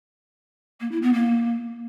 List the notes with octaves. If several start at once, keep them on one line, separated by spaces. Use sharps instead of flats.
A#3
E4
B3
A#3